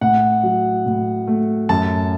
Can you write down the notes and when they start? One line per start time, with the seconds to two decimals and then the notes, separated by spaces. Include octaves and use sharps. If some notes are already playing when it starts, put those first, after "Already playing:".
0.01 A2 F#5
0.43 F#3
0.86 A2
1.27 A3
1.69 F#2 A5